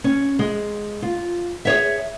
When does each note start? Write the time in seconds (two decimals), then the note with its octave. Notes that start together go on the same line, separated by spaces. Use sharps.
0.04 C#4
0.39 G#3
1.02 F4
1.65 G#4 C#5 E5